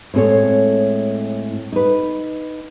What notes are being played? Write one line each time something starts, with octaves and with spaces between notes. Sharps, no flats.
A2 G#3 C4 F4 A4 C#5
D#4 B4